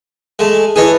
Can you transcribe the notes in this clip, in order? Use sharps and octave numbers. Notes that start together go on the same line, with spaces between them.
G#3 A3
E3 G#4 A4 B4 C#5 D#5